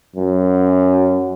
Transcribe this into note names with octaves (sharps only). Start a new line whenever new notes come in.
F#2